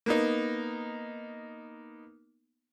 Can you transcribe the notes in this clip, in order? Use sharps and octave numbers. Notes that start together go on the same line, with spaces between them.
A#3 B3 D#4